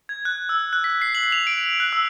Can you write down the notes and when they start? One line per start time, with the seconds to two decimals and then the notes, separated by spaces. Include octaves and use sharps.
0.09 G#6
0.25 F#6
0.49 E6
0.73 F#6
0.84 B6
1.02 C7
1.15 F#7
1.32 F7
1.47 D7
1.80 F#6
1.93 E6